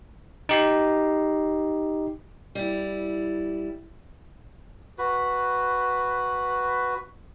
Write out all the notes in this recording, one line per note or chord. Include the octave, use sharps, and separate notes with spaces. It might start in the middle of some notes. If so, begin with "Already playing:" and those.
D#4 G4 C7
G3 E4
F#4 B4